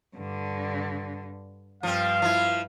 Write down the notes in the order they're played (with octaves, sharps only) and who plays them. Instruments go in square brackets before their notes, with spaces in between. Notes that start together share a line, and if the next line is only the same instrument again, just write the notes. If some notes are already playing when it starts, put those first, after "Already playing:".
[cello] G2 D3
[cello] G2 [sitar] F3 C4 [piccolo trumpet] F5
[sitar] F3 E4